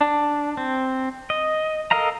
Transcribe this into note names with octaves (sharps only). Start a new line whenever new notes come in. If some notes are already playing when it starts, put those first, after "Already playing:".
D4
C4
D#5
A4 A#4 D#5 F5 A#5